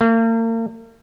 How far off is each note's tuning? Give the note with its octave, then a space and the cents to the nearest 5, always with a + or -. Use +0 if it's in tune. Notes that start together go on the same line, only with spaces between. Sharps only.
A#3 -40